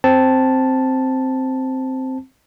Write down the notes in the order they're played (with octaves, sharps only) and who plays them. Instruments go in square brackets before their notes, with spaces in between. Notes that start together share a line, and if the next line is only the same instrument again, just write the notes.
[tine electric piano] C4 A5